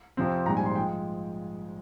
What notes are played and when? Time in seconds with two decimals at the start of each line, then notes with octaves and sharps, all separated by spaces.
0.17 F2 C3 F3 C4
0.46 A#1 G#2 G3 A#5
0.57 G#5
0.66 C6
0.76 F3 G#3 G5